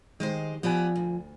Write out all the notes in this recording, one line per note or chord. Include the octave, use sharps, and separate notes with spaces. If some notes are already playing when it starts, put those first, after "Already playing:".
D#3 G#3 G4 C5
F3 B3 G4 D5 G#5
D2